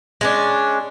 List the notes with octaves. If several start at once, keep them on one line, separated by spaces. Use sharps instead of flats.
G#3 C#4 D4